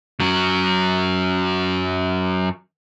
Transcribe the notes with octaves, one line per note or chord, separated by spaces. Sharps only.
F#2 F#3